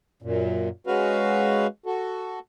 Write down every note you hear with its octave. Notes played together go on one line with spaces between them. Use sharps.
F#2 A#2
G#3 C#4 F#4 B4 F5
F#4 A4